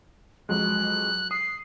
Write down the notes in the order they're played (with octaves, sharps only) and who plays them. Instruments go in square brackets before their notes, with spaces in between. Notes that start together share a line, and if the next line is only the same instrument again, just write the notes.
[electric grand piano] F2 F#3 G#3 [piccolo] F#6
[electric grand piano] D#6 [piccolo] C7